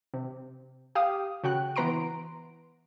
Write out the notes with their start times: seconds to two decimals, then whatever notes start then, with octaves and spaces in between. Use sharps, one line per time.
0.14 C3
0.95 G4 F5 D#6
1.44 C#3 F#4 G5 F#6
1.76 E3 B3 B4 A#5 C6 D7